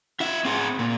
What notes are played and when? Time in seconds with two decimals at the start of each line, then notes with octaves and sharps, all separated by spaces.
0.20 F4 E5
0.45 C4 G#4
0.79 A#2